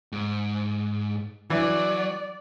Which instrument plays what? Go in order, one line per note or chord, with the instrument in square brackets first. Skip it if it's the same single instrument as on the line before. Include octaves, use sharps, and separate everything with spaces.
[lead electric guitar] G#2
[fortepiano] E3 [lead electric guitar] F#3 [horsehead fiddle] D5